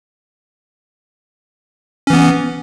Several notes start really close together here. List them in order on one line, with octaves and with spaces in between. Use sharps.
C#4 E3 B3